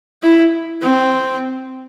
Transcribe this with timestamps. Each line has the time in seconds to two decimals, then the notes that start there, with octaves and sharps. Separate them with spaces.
0.23 E4
0.82 C4